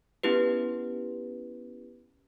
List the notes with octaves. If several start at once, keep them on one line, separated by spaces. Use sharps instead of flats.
B3 C#4 E4 G4 B4